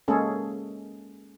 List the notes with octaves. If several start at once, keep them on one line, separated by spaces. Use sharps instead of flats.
G#3 A#3 C#4 G#4 A4